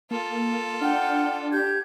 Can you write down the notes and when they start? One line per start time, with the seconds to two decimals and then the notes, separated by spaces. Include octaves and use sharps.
0.11 A#3 F4 A4
0.81 D4 F#5 G5 F6
1.51 G4 G6 G#6